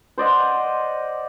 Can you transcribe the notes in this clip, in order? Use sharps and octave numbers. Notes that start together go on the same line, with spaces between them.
C5 D5 D#5 F#5